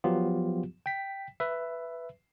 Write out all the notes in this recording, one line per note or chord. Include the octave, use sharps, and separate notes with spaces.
F3 F#3 B3 F4 G4
G5 B6
B4 E5